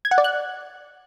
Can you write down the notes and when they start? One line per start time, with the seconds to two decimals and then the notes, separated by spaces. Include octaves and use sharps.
0.05 G#6
0.11 F#5
0.18 D5
0.24 F#6